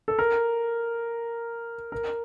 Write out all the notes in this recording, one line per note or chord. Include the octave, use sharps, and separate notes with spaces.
A4
A#4
A#4